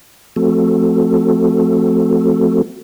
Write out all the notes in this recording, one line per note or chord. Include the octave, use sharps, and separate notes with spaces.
F3 A3 C4 F#4 A4